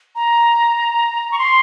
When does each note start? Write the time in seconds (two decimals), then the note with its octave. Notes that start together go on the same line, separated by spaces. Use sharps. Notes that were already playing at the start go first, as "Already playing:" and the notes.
0.16 A#5
1.31 C#6
1.39 C6